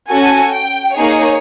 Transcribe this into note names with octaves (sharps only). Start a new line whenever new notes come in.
C#4 F#4 A4 G#5
G5
A#3 D#4 G#4 C#5